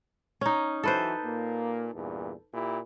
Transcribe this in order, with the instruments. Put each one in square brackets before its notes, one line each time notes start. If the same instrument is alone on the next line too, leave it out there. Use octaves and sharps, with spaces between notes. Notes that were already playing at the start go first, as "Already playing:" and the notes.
[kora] C#4 D#4
[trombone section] E3 F#3 [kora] A4 B4 C5
[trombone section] A#2 A#3
E2 G2 A#2
A#2 E4 G4